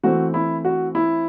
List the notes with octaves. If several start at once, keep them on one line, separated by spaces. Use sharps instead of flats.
E3 A3 C4 F#4
E4
F#4
E4